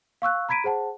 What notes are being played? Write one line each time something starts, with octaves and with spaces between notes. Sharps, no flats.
F5 C#6 E6 F#6
A#5 B5 G#6 B6 D7 D#7
G#4 C5 F#5 A5